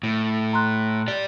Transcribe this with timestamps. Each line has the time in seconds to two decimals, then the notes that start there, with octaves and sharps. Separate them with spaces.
0.03 A2
0.53 A#5 C6 F#6
1.08 G4 D5